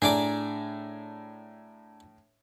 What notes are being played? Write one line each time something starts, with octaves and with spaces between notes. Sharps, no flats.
A2 D4 G#4 D5 A#5 D6